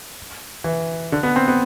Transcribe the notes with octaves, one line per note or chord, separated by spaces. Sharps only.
E3
D3
B3
C4
B3